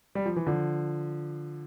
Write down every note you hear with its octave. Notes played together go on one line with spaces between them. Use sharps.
G3
F3
E3
D3 F3